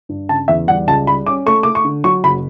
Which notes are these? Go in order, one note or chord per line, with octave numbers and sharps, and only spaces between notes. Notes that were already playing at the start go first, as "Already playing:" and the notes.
G2
C#3 A5
E2 E5
G3 F#5
C#2 A5
G3 B5
C#4 D6
A3 C#6
A3 D6
C#6
D3
F#3 C#6
F#1 B5